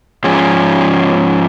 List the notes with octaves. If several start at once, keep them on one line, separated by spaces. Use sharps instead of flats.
G#2 F3 C#4 G#4